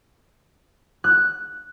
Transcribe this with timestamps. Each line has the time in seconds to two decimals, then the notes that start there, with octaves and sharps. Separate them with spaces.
1.04 F#6